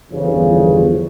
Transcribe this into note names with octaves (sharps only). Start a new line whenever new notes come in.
G1 E2 C#3 F3